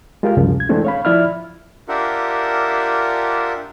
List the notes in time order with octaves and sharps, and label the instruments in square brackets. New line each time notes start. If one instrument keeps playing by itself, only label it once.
[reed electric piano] G#3 F4 G4 A#4 F5
C2 F#2 C#3 F3
C#2 G#6
E3 G#3 A3 C4 D4 E4
C#5 F5 B5
F3 E4 D5 E5 B5 F6
[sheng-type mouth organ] D4 F4 G4 A#4 E5 F#5